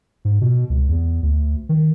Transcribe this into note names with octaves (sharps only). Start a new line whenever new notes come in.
G#2
B2
C#2
E2
D2
D#3